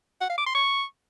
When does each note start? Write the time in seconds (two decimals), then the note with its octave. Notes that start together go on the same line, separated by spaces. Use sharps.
0.21 F#5
0.30 F5
0.38 D6
0.46 C6
0.55 C#6